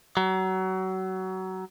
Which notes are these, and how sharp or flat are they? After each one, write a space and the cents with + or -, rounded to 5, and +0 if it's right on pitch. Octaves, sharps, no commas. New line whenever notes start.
F#3 +25